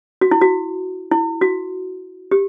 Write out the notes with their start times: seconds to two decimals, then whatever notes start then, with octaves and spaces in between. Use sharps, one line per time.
0.21 F#4
0.31 E4
0.41 F#4
1.11 E4
1.41 F#4
2.31 G4